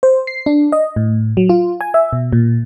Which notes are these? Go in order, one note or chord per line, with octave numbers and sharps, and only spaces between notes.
C5
C7
D4
D#5
A2
F#3
F4
G#5
E5
B2
A#2